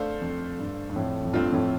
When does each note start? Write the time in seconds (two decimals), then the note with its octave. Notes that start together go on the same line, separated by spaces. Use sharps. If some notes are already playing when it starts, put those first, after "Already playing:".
Already playing: A3 D4 A4 C5 F5
0.21 F2
0.59 G2
0.90 G2
0.96 F2 A2
1.23 F2
1.33 G2 A3 C4 F4
1.52 F2 A2